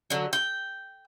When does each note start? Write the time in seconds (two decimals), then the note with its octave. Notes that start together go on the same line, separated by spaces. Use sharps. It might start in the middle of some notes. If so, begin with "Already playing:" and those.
0.10 D3 F#3
0.33 G5